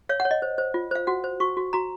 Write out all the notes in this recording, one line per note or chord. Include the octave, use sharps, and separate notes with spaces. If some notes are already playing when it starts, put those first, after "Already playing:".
C#5 F5
F#5
C#5
D#5
C5
C5
F4
C5 F5
F#4 F#5
C5
F#4 C#6
F#4
F#4 A#5